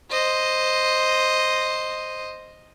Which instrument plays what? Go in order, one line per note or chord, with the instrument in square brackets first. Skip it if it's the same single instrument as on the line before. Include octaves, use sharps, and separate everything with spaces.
[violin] C5 D#5